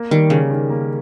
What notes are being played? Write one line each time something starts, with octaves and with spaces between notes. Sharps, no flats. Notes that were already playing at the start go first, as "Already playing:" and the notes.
Already playing: A#3
D#3 G3
C#3 C#4
D#3
A#3